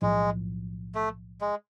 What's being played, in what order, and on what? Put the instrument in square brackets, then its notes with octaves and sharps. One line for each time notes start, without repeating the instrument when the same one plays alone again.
[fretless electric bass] B1 A2 F3 [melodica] G#3
[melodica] A3
G#3